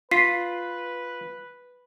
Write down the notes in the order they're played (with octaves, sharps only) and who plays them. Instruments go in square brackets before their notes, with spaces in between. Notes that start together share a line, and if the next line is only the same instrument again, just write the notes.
[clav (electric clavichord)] F4 [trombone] B4 [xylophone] B6 C7